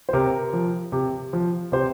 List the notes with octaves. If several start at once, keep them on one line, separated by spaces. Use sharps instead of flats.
C5
C3 A#4
F3
C3
F3
C3 C5